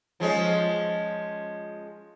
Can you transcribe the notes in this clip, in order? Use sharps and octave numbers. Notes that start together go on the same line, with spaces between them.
F3 G#3 C#4